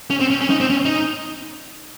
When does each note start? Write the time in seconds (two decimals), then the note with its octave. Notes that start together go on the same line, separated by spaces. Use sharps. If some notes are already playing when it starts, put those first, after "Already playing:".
0.10 C#4
0.20 C4
0.30 C#4
0.41 C#4
0.50 D#4
0.60 C4
0.70 C#4
0.85 D#4